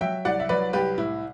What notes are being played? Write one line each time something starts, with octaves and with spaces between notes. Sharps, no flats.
F#3 E5 G5
C2 D5 F#5
E5
F#3 B4 D5
C2 G4 B4
A2 E4